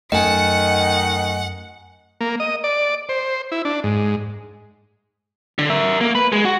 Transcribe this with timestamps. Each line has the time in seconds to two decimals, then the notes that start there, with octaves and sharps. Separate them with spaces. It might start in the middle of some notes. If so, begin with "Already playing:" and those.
0.12 F#2 D#3 A3 D#5 F#5 G#5 C#7
2.21 A#3
2.40 D#5
2.64 D5
3.09 C5
3.52 E4
3.65 D4
3.84 G#2
5.59 D3
5.70 A#4 E5
6.01 A#3
6.15 B4
6.32 G#3
6.45 F#4